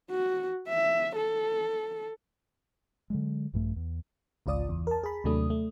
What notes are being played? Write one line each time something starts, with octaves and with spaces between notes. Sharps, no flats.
F#4
E5
A4
D3 F#3 G#3
A#1 G2 A3
E2
G#1 C#2 F4 D5 D#6
E2
A#4 A5
G#4 B5
D#2 C3 F#3 A3 D4 D#6
A3